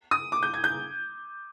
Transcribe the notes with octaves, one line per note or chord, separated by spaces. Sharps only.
D#6
D6
G6
G#6
G6